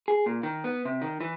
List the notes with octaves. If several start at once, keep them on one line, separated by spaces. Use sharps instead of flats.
G#4
A#2
D#3
B3
C3
D#3
E3